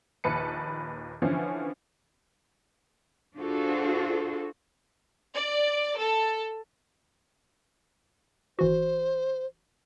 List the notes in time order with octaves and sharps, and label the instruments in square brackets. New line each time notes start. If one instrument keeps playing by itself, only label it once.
[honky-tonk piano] A#1 D#2 B4 A5 C#7
D3 E3 F3 C#4
[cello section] D4 F4 F#4 G#4 A4 C5
[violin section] D5
A4
[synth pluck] G#1 E3 F#4 [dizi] C5